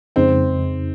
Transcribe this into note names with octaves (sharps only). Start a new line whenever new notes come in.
F2 C#3 G#3 C4 D#4